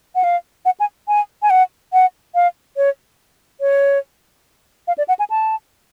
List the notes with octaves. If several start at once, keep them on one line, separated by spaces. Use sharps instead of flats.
F#5
F5
F#5
G#5
G#5
G#5
F#5
F#5
F5
C#5
C#5
F5
D5
F#5
G#5
A5